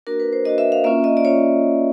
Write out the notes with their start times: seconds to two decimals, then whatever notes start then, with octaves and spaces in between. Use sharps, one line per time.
0.07 A#3 D4 F#4 A#4
0.20 B4
0.33 C5
0.45 A#3 D4 F#4 D#5
0.58 E5
0.72 F5
0.84 A#3 C#4 F4 E5
1.04 D#5
1.17 D5
1.25 C#4 F4 C#5